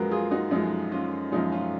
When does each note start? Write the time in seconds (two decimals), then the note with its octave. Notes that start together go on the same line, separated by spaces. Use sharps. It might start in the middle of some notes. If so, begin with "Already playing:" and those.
Already playing: F#2 F3 G#3 F#4 A#4 B4
0.11 F4 G#4
0.31 D#4 F#4
0.51 F#2 F3 G#3 D#4
0.92 C#4 F4
1.32 F#2 F3 G#3 D#4
1.52 C#4 F4